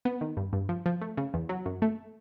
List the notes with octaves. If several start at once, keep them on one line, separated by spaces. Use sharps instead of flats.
B3
D#3
G2
G2
F3
F3
A3
C#3
E2
F#3
F#2
A3